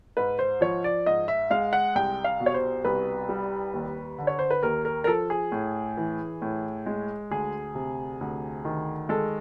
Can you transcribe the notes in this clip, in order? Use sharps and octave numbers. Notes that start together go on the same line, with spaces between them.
G#2 B4
C5
F3 C#5
D5
G#2 D#5
E5
G#3 F5
F#5
C2 G5
F5
B2
C#5
C5
C2 B4
G3
D#2
D3
C#5
C5
B4
D#2 A#4
A#4
A#4
F3 A4
G#4
A2
E3
A2
G#3
D2 G#4
C3
D2
D#3
G#3 A4